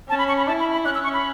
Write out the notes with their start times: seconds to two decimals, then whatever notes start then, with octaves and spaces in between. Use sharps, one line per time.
0.09 C#4 A5
0.19 B5
0.28 C#6
0.38 B5
0.48 E4 A5
0.60 B5
0.72 B5
0.85 C#4 F#6
0.95 E6
1.04 C#6
1.14 B5